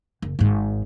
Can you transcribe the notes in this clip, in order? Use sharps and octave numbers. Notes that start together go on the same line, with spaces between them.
F#1
G#1 G#2